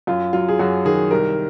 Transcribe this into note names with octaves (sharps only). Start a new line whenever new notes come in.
F#2 F4
F#3 F4
G#4
F#2 F#4
D#3 G#4
C2 A#4